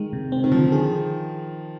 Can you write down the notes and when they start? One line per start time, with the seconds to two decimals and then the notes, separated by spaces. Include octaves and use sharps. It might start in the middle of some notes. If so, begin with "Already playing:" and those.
Already playing: D#3 G#3
0.13 C3
0.32 C4
0.44 D#3
0.52 D3 F3
0.72 D#3 G#4